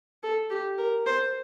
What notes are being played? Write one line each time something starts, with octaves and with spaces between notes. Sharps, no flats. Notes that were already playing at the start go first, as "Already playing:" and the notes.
A4
G4
A#4
C5